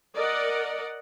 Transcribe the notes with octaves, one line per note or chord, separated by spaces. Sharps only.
A#4 D5 D#5 F#5